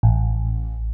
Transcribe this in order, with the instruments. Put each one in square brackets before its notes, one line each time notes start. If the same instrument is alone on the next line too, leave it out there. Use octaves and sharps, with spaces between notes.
[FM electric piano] A1